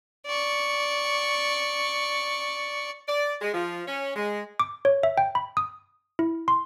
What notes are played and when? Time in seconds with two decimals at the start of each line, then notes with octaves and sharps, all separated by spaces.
0.26 D5 C#6
3.08 D5
3.41 G#3
3.54 F3
3.87 C#4
4.16 G#3
4.60 D6
4.85 C#5
5.03 E5
5.18 G5
5.35 B5
5.57 D#6
6.19 E4
6.48 C6